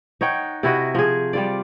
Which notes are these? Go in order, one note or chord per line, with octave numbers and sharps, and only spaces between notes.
D#4 C#5 F#5 G5
C3 E4 F#4 D#5
F3 G#4
G3 F4 D5